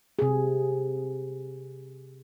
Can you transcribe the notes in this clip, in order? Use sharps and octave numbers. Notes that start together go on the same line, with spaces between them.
C3 G#4